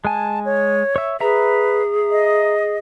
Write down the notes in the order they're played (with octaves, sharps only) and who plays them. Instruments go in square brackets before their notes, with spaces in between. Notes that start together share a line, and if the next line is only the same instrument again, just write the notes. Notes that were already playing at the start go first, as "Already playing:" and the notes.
[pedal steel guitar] G#3 G#5 [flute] A5
[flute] C#5
[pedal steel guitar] C#5 E5
[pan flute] G#4 [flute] B4 [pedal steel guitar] E5 A#5
[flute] D#5